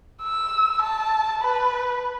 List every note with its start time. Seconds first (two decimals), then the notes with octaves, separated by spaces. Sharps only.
0.22 E6
0.83 A5
1.42 B4